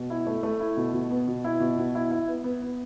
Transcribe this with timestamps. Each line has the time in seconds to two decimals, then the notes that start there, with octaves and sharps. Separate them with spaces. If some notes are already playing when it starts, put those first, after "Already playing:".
Already playing: B2
0.10 E4
0.27 A3
0.43 A3
0.60 E4
0.77 B2
0.93 B2
1.11 B3
1.28 B2
1.44 E4
1.60 B2
1.78 B2
1.95 E4
2.11 E4
2.28 B3
2.44 B3
2.62 B3